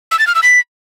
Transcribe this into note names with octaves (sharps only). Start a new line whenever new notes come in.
E6
A6
F6
E6
B6